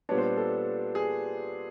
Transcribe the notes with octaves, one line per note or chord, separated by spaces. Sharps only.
A#2 G3 B3 D4 C#5
C5
A4
G#4